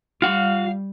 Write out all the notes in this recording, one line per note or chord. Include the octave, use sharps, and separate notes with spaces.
G3 F4 F5 F#5